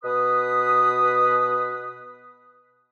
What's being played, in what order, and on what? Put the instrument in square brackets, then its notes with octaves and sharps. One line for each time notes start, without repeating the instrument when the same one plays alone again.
[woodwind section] B2 B4 D#6